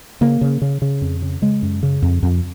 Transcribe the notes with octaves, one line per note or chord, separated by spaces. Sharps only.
C#3 A#3
C#3
C#3
C#3
F2
C#3
C#3 G#3
F#2
C#3
F2
F2